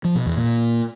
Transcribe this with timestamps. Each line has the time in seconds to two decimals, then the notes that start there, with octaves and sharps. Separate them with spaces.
0.04 F3
0.15 B2
0.26 E2
0.37 A#2